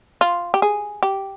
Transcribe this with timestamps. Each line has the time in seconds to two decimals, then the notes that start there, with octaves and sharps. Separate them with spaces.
0.21 F4
0.54 G4
0.62 G#4
1.03 G4